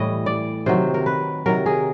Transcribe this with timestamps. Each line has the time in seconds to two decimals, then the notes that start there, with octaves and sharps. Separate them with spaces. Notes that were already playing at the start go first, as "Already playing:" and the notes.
Already playing: A2 E3 G3 D#5
0.26 D5
0.66 C3 D#3 F#3 C5
0.94 A#4
1.06 B4
1.46 C3 D#3 F#3 A#4
1.66 G#4